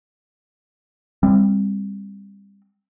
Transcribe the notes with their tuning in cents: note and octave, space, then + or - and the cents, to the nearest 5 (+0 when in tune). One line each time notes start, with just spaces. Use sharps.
G3 +30 C4 +10